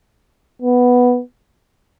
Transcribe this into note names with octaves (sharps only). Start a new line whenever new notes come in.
B3